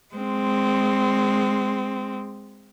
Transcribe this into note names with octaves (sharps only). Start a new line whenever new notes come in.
G#3 C4